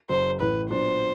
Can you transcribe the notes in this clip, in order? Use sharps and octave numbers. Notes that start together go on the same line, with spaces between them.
F#1 F#2 C#3 F#3 C5
A1 A2 E3 B4
A#2 F#3 B3 D4 C5